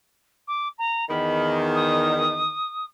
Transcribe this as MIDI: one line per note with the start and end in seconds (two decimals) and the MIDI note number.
0.47 0.68 86
0.78 1.07 82
1.08 2.57 40
1.08 2.57 51
1.08 1.58 83
1.75 2.85 87